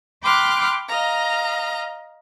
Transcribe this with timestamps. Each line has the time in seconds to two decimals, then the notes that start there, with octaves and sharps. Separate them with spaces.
0.22 G5 B5 C6 D6 F6 F#6
0.89 D#5 F5 A#5